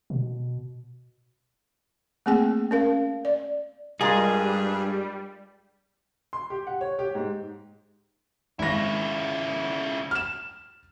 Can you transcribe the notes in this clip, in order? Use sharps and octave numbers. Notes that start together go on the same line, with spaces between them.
B2
A3 A#3 C4 G#4 G5
C#4 A#4 F5
D5
G2 G3 G#3 F4 G#4 A#4
C6
G4
F#5
C#5
G4
G#2
G#1 C#3 E4 A#6
F6 E7